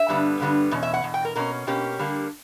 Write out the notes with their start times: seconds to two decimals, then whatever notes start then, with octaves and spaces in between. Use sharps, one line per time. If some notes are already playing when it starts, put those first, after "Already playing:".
Already playing: E5
0.09 G2 D3 G3 B3
0.40 G2 D3 G3 B3
0.71 E2 B2 C#4
0.83 E5
0.94 F#5
1.04 E2 B2
1.14 G5
1.25 A#4
1.35 B2 A#3 C#4 A#4
1.67 B2 A#3 C#4 G4
1.99 D3 G3 A#3